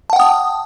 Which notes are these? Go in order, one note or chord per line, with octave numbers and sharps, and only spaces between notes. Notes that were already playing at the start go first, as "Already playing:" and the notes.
F#5 G5 A5 D#6